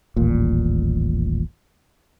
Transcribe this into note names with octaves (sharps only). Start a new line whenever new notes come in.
D#1 A1 A#2